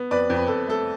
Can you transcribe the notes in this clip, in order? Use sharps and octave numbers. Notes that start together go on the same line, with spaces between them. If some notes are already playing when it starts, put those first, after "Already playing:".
Already playing: B3
F2 B4 D5
F2
B4
F2 A4
A3 A4